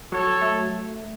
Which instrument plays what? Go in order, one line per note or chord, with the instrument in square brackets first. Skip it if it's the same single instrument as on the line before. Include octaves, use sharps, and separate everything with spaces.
[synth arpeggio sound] F#3 [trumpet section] A4 C#5
[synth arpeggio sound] A3